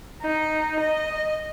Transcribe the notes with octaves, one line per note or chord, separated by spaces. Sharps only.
D#4
D#5